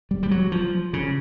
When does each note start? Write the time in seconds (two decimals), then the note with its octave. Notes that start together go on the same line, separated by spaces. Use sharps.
0.11 G3
0.23 G3
0.31 F#3
0.52 F3
0.93 C#3